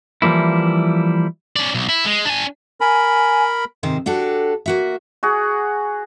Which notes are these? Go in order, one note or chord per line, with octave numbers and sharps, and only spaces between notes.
E3 F3 G3 A#3 E4
C#4 D5
B1
E4
G#3
D4 G#5
A#4 G#5 B5
G#2 C3 D#3 C5
D4 F#4 G4 A4
A#3 F#4 E5
F#4 G#4